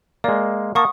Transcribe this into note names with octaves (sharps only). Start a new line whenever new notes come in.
G#3 A#3 D5
A#3 F#5 A5 C#6 D#6